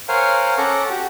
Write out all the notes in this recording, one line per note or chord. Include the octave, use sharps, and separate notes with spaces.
A#4 C5 C#5 F5 F#5 G#5
C#4 A4 F#5 A#5 C#6 D6
F#4 G4